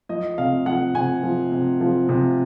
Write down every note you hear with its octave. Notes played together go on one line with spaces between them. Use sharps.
F3 D#5
C3 F5
F3 F#5
C3 G#5
F3
C3
F3
C3